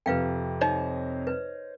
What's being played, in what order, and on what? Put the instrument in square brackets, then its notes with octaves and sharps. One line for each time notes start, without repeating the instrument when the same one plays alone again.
[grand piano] F2 C3 [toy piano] B4 F5 G5
[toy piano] D#4 [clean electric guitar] C5 C#5 D#5
[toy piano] B4